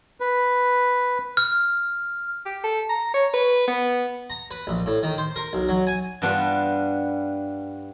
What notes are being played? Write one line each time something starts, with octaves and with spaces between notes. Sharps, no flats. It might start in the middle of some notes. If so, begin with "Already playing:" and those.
B4
F6
G4
A4
A#5
C#5
B4
B3
A#5
B4
A#1
A2
D#3
C5
A#4
B1
F#3
G#5
G2 G3 B3 D4 F4